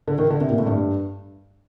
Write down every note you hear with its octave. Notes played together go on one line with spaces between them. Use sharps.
D3
D#3
D3
C3
A#2
A2
G2